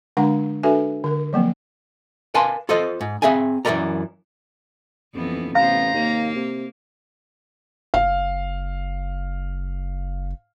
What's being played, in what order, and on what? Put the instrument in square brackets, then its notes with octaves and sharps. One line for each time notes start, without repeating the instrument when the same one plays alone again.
[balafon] D3 G#3 D4 F5 F#5 A#5
D4 F#4 A4 B4 E5 G#5
D3 A#4
F3 F#3 A#3 C4
[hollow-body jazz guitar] A#4 B4 F5 G#5 A5 C6
F4 A4 C5 D#5
G#2
C4 G#4 E5 F5 G#5
F#2 E3 F3 A#4 D5 A#5
[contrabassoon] D#1 [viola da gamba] F2 E3 B3
[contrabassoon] A1 [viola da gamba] C3 B3 C5 [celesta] F5 [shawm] A#5
[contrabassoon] D#2 [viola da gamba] A#3
[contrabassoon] C3
[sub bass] F#1 [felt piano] F5